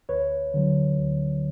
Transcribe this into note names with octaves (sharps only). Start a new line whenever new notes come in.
D2 B4 C#5
D3 F#3
D2